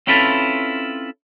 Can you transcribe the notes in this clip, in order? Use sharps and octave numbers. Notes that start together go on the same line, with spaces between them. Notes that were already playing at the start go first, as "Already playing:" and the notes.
C4 C#4 E4 F4 A4 B4